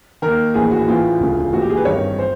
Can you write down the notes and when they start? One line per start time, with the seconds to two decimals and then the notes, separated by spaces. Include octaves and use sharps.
0.22 D#2 D#3 A#4
0.54 A#1 A2 E3 G#4
0.71 F#4
0.87 A1 A2 E3 F4
1.20 E1 D2 C#3
1.53 A#1 A2 E3 F#4
1.61 G4
1.70 G#4
1.77 B4
1.85 G#1 G2 D#3 C#5
2.19 C5